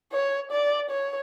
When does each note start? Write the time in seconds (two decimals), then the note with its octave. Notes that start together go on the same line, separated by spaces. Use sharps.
0.12 C#5
0.52 D5
0.90 C#5